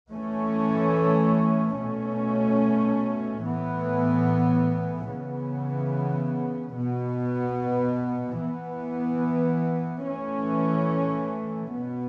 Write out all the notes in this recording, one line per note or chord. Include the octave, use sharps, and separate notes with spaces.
E3 A3 C#4
B2 A3 C#4
A2 E3 B3
C#3 E3 B3
B2 B3
E3 B3
E3 A3 C#4
B2 B3